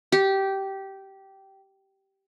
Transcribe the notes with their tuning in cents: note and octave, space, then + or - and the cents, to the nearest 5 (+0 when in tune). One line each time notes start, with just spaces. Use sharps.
G4 -15